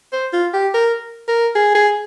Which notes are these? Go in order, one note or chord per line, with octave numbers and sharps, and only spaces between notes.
C5
F4
G4
A#4
A#4
G#4
G#4